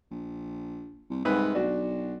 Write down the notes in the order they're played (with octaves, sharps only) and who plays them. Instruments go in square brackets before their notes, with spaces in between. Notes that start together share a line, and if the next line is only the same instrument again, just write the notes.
[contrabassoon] A#1
C2
[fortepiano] C2 B4 F#6 [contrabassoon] G#2
[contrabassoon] B1 [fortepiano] D4 F#4